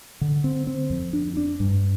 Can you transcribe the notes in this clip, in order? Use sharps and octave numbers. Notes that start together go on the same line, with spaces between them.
D3
C4
C4
F2
D4
D4
G2